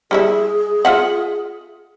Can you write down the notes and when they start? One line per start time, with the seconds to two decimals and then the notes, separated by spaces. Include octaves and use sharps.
0.11 G3 E4 G#4 E5
0.85 F4 E5 F#5